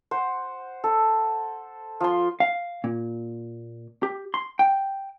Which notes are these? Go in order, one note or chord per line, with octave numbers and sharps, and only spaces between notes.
C5 F#5
A4
F3 C6
F5
A#2
G4
C6
G5